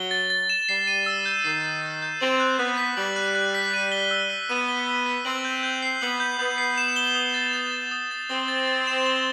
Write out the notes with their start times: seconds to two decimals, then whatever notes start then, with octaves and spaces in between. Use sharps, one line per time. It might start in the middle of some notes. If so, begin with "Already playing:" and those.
Already playing: F#3 G7
0.11 A6
0.30 A6
0.50 E7
0.69 G3 C7
0.87 D#7
1.06 E6
1.25 G6
1.44 D#3 C7
1.63 D#7
1.83 E6
2.02 G6
2.21 C4 F#7
2.40 F#6
2.58 B3 F#6
2.77 B6
2.97 G3 F#7
3.16 F#6
3.35 F#6
3.54 B6
3.74 D#7
3.92 G7
4.11 E6
4.30 B6
4.49 B3 D#7
4.68 G7
4.87 E6
5.06 B6
5.25 C4 F#7
5.45 G6
5.63 G6
5.82 C7
6.01 B3 F#7
6.20 G6
6.39 B3 G6
6.58 C7
6.78 E7
6.96 G7
7.15 D#6
7.34 A6
7.53 E7
7.72 G7
7.91 D#6
8.11 A6
8.29 C4 G7
8.48 A6
8.68 A6
8.87 E7
9.06 G7